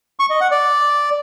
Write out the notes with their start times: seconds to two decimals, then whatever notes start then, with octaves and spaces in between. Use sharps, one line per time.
0.19 C#6
0.30 D#5
0.41 F#5
0.51 D5